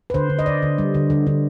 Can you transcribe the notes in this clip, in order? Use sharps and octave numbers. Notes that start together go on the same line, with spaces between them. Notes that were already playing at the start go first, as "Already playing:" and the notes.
B4
D3 C5
D3
D#5
D3 D5
D3
G3
D3
D3
D3